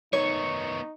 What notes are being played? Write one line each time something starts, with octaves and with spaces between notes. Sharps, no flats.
D#3 B3 D#4 C#5 C#6